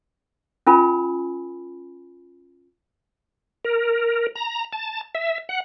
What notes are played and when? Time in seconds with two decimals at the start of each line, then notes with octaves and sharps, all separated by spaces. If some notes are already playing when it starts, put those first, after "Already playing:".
0.67 C#4 F4 A#4 G#5 B5
3.65 A#4
4.35 A#5
4.73 A5
5.15 E5
5.49 F#5